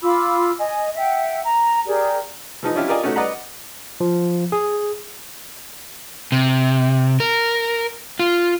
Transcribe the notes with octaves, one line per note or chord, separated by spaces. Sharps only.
F4 B5 D6 E6
D#5 G#5
E5 F#5 G5
A#5
G4 G#4 A#4 D5
E3 F3 D#4
C#4 D4 E4 F4 G4
F4 G4 A#4 D5 D#5 G#5
A3 C#4 D#4 F#4
B4 D5 D#5 F#5 A#5 B5
F3
G#4
C3
A#4
F4